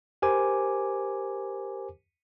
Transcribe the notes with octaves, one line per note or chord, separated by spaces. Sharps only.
G4 A#4 C5 G#5 D6